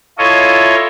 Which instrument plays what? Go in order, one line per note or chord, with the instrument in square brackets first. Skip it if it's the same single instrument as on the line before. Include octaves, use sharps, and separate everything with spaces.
[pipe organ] E4 F4 A4 C#5 D#5